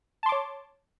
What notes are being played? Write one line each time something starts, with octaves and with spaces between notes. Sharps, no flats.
C#5 A5 C6 D6